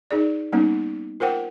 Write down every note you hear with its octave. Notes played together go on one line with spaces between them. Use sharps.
D#4 G#4 D5
G3 A#3 B3 C#4 D#4
F4 A#4 C5 F#5 G5